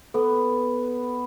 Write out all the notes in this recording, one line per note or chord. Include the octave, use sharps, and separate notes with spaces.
B3 A4